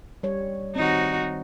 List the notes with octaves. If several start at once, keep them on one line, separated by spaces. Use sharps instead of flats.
G3 C#5
D#3 C4 D#4 F#4